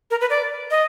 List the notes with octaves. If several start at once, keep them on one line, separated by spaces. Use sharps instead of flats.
A#4
B4
D5
D#5